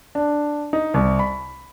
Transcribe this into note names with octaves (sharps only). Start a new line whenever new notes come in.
D4
D#4
C2
B5